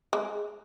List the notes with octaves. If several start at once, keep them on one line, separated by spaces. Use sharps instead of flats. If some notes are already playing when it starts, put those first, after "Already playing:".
G#3